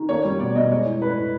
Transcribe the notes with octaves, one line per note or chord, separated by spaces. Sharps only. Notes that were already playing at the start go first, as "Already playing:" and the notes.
Already playing: D#3
A#3 C#5
G3
B2 D5
B2 D#5
G#3 C#5
E3
A2 B4
A2